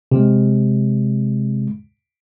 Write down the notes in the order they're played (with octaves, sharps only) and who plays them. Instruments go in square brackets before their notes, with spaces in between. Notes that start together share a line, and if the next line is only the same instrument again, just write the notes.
[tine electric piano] C3 G#3